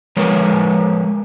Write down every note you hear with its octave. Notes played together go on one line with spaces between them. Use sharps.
F3 G#3 A#4 B4 C#5